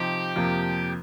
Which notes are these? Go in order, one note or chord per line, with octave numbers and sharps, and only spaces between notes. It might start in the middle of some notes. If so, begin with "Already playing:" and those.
Already playing: C3 F3 C4 D#4 G4
F2 C3 F3 A#3